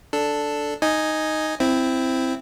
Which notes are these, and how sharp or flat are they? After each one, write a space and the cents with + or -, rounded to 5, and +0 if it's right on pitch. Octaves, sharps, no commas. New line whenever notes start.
D4 +0 A4 +0
D#4 +0 D#5 +0 G#5 +0
C4 +0 E4 +10